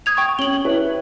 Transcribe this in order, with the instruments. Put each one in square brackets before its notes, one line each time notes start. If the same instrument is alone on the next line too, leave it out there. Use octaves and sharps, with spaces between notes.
[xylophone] D#6 G#6 F7
G5 C#6
[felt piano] C#4 [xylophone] F#7 G7
[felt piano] E4 B4 C#5